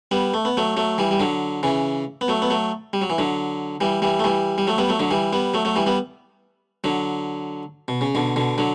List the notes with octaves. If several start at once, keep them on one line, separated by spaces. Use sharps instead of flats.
G3 B3
A3
B3
F#3 A3
F#3 A3
E3 G3
G3
D3 F#3
C#3 E3
B3
F#3 A3
B3
F#3 A3
G3
F#3
E3
D3 F#3
E3 G3
E3 G3
A3
E3 G3
G3
F#3 A3
G3 B3
F#3 A3
D3 F#3
E3 G3
G3 B3
F#3 A3
F#3 A3
E3 G3
G3 B3
D3 F#3
B2
C#3
B2 D3
B2 D3
D3 F#3